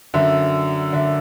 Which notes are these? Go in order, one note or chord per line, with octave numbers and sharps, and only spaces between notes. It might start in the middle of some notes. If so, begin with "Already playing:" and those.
F#2 D3 E5
D3 E5